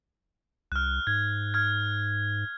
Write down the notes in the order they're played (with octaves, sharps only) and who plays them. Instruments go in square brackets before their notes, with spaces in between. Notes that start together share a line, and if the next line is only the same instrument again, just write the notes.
[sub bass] C2 [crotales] F6 F#6
[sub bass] G#2 [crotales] G#6
[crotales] F6 G#6